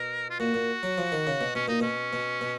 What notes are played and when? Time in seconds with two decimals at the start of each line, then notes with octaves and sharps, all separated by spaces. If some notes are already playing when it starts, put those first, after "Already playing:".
Already playing: B2 A#4
0.30 F4
0.40 A#2 F#4
0.54 A#2
0.83 F#3
0.98 F3
1.12 D#3
1.27 C#3
1.41 B2
1.55 B2 C#4
1.68 A#2 D#4
1.81 B2 C#4
2.13 B2
2.41 B2